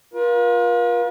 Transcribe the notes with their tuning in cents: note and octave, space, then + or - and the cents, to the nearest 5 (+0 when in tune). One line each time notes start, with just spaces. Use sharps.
F4 +15 A#4 +45